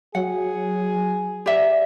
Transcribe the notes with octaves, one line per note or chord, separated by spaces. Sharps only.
F#3 G#4 F#5
G4 D5 E5